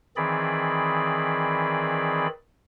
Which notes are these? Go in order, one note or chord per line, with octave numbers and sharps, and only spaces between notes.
D#3 E3 C4 G#4 D5 B5